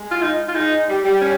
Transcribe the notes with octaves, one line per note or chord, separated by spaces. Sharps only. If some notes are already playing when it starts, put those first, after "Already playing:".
Already playing: G#3
F4
D#4
F4
G#3 D#4
G3
G3
C#4